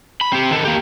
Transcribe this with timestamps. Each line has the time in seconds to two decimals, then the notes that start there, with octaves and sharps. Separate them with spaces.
0.21 B5
0.33 C4 G4
0.51 D#3 A4
0.65 A#3 G4